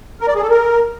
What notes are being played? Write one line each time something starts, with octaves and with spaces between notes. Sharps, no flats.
A#4
D5
G#4
A4
A#4